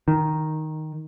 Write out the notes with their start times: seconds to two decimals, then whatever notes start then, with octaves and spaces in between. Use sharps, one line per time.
0.08 D#3